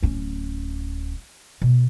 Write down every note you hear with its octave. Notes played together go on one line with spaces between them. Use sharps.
D1 C#4
B2